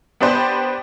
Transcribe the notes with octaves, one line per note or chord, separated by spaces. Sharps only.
B3 D4 G4 B4 C5 D5